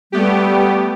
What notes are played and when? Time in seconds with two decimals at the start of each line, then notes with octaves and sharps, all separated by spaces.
0.12 G3 A3 B3 G4